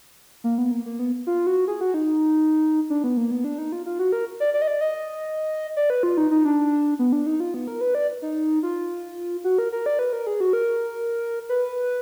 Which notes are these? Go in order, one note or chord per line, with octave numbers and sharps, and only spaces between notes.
A#3
B3
A#3
A#3
B3
F4
F#4
G#4
F#4
D#4
D4
B3
A#3
B3
D4
D#4
F4
F4
F#4
A#4
D5
D5
D#5
D5
D#5
D5
B4
F4
D#4
D#4
D4
B3
D4
D#4
F4
B3
A#4
B4
D5
D#4
F4
F#4
A#4
A#4
D5
B4
A#4
G#4
F#4
A#4
B4